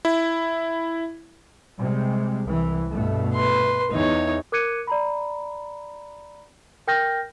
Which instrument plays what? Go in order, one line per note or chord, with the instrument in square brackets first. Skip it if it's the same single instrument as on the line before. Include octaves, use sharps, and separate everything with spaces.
[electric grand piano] E4
[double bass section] C3 G3 G#3
C2 E3
G2 B2 A3
[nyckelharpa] B4 C6
[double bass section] E2 [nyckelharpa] D#4 C#5
[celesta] A#4 D6 F#6 G#6 C#7 D#7
D5 A#5 B5
A#4 G5 F6 G6 A#6